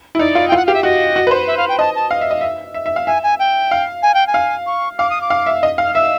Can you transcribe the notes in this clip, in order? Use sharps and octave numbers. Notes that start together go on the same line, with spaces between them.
E4
D#4 D5
F4
G5
F4
F#5
G4 F5
E5
F#4 D#5
F#4
B4
C5
E5
F5
G5
D#5 A5
A5
F5
E5
D#5
E5
E5
E5
F5
E5 G#5
G#5
G5
F5
G#5
G5
G#5
F5
C#6
F5 D6
D#6
D6
F5
E5
D#5
F5
F6
E5 E6